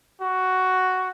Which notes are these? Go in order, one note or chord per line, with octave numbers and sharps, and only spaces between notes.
F#4